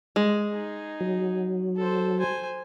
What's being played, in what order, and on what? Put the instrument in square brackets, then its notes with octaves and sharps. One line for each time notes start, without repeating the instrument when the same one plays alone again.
[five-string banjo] G#3
[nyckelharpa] D#4 G#4
[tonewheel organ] F#3
[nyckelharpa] A4 C5
C5 G#5